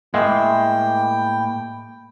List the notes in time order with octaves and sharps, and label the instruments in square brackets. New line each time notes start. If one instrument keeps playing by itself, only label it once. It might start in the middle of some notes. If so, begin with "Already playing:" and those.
[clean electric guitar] A2 A#3 E5 [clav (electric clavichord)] G#3 [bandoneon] G5